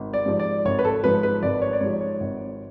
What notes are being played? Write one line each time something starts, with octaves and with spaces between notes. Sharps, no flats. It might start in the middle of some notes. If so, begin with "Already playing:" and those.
Already playing: G#1
D5
G#2 F3
D5
G#1 C#5
B4
A4
G#2 F3 B4
B4
G#1 D5
C#5
D5
G#2 F3 C#5
C#5
G#1